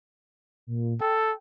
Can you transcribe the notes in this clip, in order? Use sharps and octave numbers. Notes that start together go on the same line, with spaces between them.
A#2
A4 G5